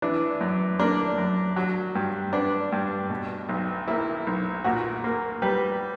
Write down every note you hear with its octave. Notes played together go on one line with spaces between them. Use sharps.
E3 D4
F#2
A#3 D4
F#2
F#3
G2
B3 D4
G2
B2
B1
A#3 E4
B1
A#2 F#4
A#3
G3 B4